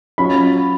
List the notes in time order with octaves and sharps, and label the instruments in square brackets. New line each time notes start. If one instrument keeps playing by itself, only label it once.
[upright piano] F#3 C#4 F4 B5